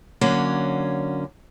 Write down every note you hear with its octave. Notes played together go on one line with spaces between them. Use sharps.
D3 F#3 A#3 C#4